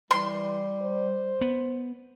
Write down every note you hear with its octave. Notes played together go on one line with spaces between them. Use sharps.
E3 G3 C6
C5
B3